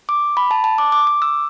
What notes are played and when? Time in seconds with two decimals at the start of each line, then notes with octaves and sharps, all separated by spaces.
0.09 D6
0.37 B5
0.51 A5
0.64 A5
0.78 D6
0.92 D6
1.07 D6
1.22 E6